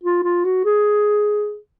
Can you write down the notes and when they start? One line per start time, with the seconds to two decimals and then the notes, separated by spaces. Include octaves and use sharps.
0.04 F4
0.23 F4
0.45 F#4
0.65 G#4